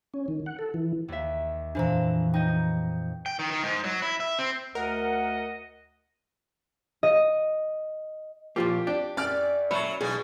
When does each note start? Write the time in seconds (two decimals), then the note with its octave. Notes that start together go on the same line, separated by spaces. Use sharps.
0.14 C#4
0.28 D#3
0.46 F#5
0.59 A4
0.74 E3
1.08 D#2 E5
1.75 F2 A#2 E3 D4 C5 A#5
2.34 D#4 D#5 G5 G6
2.49 D#4
3.26 G5
3.39 D#3
3.51 D#3
3.63 G#2
3.84 F#3
4.02 E4
4.20 E5
4.39 C4
4.75 D2 A#4 D#5 F#5
7.03 D#5
8.56 A#2 F3 A#3 F4 G4
8.87 D4 G4
9.17 F#2 D5 F6
9.71 F#3 C#5 E5 B5
10.01 B1 B2 G#4